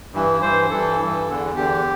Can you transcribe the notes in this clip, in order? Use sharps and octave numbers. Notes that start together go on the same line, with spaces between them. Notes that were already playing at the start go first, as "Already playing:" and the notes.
G2 E3
G2 E3 C5
G2 E3 A4
G2 E3
E2 D3
E2 D3 G4